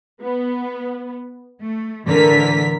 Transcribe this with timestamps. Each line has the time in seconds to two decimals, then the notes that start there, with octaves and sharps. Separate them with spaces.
0.22 B3
1.61 A3
2.07 A2 D3 E3 A#4 B6